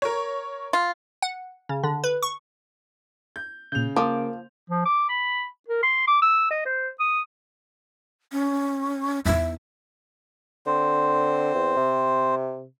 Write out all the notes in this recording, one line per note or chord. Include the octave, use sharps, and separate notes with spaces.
A#4 C#5
F4
F#5
C#3
D3
B4
C#6
G6
A#2 C#3 G6 F7
F3 A#3 D6
F3
D6
B5
A#4
C6
D6
E6
D#5
C5
D#6
C#4
E2 D#4 E5
D3 C4 C5
E2
C3